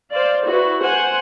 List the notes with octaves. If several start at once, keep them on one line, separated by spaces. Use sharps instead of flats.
C5 D5 F5
E4 F#4 B4
C5 F#5 G#5